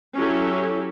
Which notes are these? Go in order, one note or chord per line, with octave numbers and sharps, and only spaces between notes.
F#3 C#4 E4 G4 A4